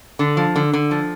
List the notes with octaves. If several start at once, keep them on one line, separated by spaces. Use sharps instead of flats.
D3
F3
D3
D3
F3